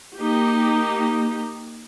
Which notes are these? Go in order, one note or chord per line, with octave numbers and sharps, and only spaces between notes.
A#3 D#4 G4